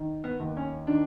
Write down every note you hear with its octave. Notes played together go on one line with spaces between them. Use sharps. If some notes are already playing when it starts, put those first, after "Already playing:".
Already playing: D#3
B3
D#2
C#4
D#3 D4